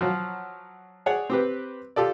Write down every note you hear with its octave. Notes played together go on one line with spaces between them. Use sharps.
F3 F#3
G#4 C#5 D5 F#5
C4 G4 B4
F4 G4 A4 D5